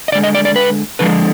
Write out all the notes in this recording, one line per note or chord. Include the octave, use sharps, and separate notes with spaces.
D#5
D3 G#3 D5
D#5
D5
D5
B4
D3 F3 G#3 B4